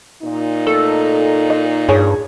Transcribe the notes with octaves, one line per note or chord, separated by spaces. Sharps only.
A#2 D#4
A3 A4
D#5
G2 G#4 C#5